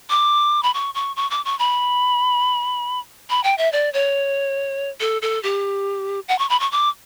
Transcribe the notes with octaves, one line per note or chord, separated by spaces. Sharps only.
D6
B5
C#6
C#6
C#6
D6
C#6
B5
B5
G5
E5
D5
C#5
A4
A4
G4
F#5
C#6
B5
C#6
D6